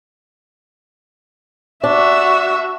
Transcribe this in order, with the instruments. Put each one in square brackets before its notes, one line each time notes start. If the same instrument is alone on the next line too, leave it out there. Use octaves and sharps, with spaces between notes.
[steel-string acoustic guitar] D4 [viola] F#4 E5